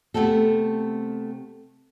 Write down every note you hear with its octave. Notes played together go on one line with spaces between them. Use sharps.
C3 A3 B3 C4 A4